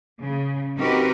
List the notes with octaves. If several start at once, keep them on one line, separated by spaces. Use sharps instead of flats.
C#3
C4 D#4 F#4 G4 A#4 B4